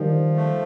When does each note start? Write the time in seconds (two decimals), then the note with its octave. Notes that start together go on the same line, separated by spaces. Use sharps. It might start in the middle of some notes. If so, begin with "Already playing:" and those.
Already playing: D#3 F3 G3
0.36 A3